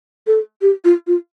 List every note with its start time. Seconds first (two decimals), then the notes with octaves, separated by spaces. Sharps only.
0.27 A4
0.62 G4
0.85 F4
1.07 F4